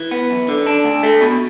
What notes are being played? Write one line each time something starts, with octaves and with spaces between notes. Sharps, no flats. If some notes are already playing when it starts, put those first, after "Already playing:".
Already playing: E3
B3
F#2
D3
D4
D2
A3
B2